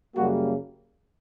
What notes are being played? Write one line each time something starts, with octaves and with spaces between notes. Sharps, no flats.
F#2 C#3 G3 A#3 F#4